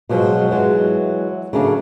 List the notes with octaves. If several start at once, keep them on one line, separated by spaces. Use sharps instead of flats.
B2 F3 F#3 G#3
E3 F#3 G#3
C#3 F#3 A3 A#3 D4